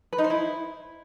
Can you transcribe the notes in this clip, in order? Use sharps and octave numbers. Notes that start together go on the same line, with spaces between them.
B4
D#4
C5
E4